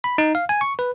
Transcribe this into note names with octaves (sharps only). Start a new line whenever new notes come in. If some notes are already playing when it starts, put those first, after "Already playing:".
B5
D#4
F5
G#5
C#6
B4